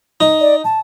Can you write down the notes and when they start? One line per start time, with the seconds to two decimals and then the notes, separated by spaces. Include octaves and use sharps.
0.20 D#4
0.41 D5
0.64 A5